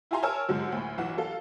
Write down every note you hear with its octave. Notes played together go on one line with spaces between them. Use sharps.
E4 F4 G4 G#5 A#5 C6
A#4 C#5 G#5 A5 E6 F6
G#2 D3 F#3 G#3
D2 A2
B1 E3 F#5
F#3 A4 F5